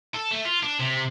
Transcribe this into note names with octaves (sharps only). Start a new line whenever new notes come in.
A4
A3
F4
D4
C3